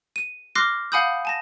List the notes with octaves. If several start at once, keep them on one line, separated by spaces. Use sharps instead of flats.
D#7
C6 D6 F6 F#6 A#6 C7
F5 F#5 G#5 B5 D#6 G6
G#5 A5 A#6